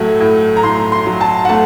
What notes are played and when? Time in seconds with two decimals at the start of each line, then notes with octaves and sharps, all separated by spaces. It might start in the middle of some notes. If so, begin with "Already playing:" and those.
Already playing: A2 F#3 A3
0.20 A2
0.56 A#5
0.63 A2 C6
0.92 C6
1.06 F#3
1.21 A5
1.45 F#5
1.49 A3 A5